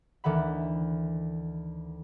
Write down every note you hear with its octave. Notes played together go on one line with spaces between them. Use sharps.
D2 D#3 E3 F#5 B5